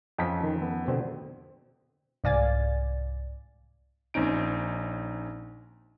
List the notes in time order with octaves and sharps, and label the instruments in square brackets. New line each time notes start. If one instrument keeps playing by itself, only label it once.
[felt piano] F2 C#4 B6 [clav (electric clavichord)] D#5 F5 A5
[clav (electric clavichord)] D#3
B3
B2 D3 C4
[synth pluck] C2 G#2 D5 F5 G#5 A6
[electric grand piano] A#1 C4 C#4 D#4 D7